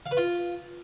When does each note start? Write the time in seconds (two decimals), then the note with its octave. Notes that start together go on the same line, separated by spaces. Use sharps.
0.06 F5
0.11 B4
0.17 F4